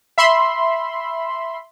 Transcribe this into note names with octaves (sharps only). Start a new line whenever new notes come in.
E5 B5 C6